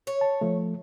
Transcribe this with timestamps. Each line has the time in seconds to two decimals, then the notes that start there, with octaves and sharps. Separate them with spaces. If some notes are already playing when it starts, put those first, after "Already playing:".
0.07 C#5
0.21 A5
0.41 F3 A3